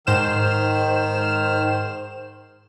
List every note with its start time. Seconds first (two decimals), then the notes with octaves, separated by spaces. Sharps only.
0.07 G#2 D#3 C5 F6 E7